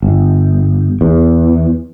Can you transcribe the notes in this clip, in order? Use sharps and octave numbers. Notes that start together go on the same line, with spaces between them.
G1
E2